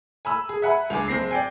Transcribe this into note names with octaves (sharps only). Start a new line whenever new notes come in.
G#5 B5 E6
G#4
E5 F#5 G#5 B5
C#2 D4 G#5 D6
F#1 C4 A#6 C7
D5 G5 G#5